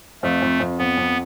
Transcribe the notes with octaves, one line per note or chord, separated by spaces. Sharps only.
F2 A3
F2
F2
F2 B3
F2